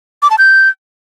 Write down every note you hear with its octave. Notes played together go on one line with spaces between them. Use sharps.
D6
A5
G6